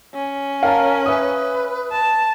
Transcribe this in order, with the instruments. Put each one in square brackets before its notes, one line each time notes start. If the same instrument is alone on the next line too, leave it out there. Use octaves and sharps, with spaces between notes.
[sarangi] C#4
[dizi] A#4 [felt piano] F5 A5
[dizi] B4 [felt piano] E5 D#6
[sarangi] A5